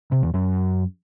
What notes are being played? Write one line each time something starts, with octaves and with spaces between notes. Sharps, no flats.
C3
E2
F#2